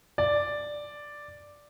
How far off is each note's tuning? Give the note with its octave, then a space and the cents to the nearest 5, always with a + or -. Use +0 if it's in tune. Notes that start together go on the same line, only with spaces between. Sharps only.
D5 +0